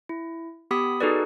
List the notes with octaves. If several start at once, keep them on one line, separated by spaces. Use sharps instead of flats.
E4
B3 G4 B5 D#6 B6
D#4 F#4 G#4 A4 B4 D5